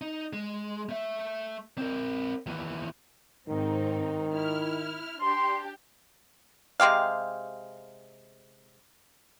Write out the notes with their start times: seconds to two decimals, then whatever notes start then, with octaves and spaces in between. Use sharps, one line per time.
0.01 D#4
0.33 G#3
0.89 A3 E5
1.78 C4 A#4
2.46 D#2 E3
3.48 G#2 D#3 C4 D#4
4.33 E4 F6
5.20 D4 G4 C6
6.80 C3 G#3 G4 F5